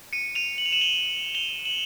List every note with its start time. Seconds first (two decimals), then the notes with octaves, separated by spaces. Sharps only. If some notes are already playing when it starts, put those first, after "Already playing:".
0.13 C#7 D#7
0.35 D#7 F7
0.58 F#7
0.66 F7
0.72 E7 F#7
0.81 F7 G7
1.35 F7 G7
1.65 E7 F#7